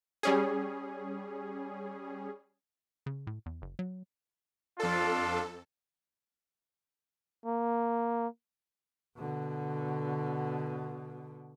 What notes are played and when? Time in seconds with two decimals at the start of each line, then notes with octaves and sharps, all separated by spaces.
0.23 G3 C#4 G#4
3.06 C#3
3.27 A2
3.46 E2
3.62 F#1
3.79 F#3
4.80 F2 D4 F4 A4
7.46 A#3
9.18 B2 D3